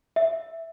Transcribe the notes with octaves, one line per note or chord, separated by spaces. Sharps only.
E5